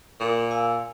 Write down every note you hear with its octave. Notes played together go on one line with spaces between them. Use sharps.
A#2 A#4
F5 G#5 E6